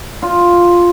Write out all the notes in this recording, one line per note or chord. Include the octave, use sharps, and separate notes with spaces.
F4